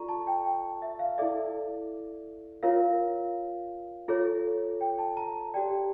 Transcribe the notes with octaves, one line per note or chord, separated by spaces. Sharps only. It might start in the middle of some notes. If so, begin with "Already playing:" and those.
Already playing: F4 A4 D5 A#5 C#6
A5
G5
G5
E5
F5
E4 A4 D5 E5
F4 A#4 C#5 F5
F4 A4 C#5
G5
A5
A#5
A5
G4 D5 G5